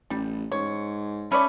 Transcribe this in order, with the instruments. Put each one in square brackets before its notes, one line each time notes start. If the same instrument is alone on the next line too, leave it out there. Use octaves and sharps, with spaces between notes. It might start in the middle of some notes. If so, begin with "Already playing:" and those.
[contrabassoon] A1 [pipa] G3
[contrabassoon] G#2 [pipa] C#5
[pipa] A3 C#5 D5 [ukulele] C#4 [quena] B5